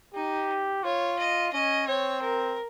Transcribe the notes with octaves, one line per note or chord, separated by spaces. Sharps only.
D#4 G4
F4 C#5
D#5
C#4 D#5
C4 C#5
A#4